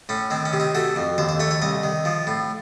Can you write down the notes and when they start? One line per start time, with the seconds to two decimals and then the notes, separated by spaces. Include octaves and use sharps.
0.09 A2 C#4
0.31 D#3 C4
0.45 C#4
0.53 C3
0.60 D#4
0.75 A3 F#4
0.96 F2
1.18 D#2 C5
1.29 C5
1.40 A3 C#5
1.51 C#5
1.62 C2 D#5
1.83 D#3
2.05 F3
2.27 A2